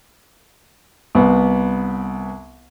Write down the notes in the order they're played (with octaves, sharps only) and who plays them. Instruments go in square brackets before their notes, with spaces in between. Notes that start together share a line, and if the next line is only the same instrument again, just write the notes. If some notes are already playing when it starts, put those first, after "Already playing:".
[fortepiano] C2 B3